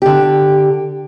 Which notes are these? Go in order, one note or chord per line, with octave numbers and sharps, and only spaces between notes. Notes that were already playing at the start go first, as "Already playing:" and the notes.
D3 G4